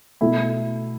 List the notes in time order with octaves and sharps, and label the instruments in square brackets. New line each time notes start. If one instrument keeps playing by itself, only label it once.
[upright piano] B2 A3 E4